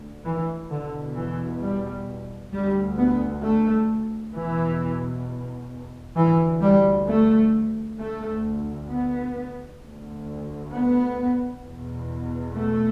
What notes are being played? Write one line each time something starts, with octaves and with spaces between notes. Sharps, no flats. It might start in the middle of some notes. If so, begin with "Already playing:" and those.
Already playing: D2
E3
E2 B2 D3
E3
G3
D2 G3
B3
A3
E2 B2 E3
D2 E3
G3
A3
D2 A3
B3
D2
B3
E2 B2
A3